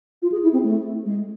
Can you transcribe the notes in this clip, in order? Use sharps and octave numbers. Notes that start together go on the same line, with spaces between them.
F4
G#4
E4
C4
A3
G#3